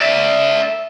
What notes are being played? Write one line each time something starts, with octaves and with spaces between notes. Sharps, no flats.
D5 E5